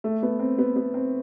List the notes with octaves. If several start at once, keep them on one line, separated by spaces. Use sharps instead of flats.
A3
B3
C4
B3
B3
C4